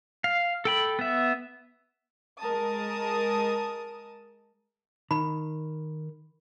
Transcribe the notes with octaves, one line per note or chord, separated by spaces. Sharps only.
F5
A4 G5 B5
B3 E5
G#3 A#4 A5 D#6
D#3 B5